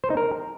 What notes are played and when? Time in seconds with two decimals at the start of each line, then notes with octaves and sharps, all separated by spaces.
0.04 C5
0.10 D#4
0.17 A#4